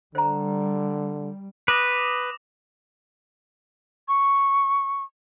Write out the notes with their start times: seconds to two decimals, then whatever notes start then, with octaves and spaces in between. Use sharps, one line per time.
0.15 D3 G3 C5 A#5
1.68 B4 D6 D#6 A#6
4.08 C#6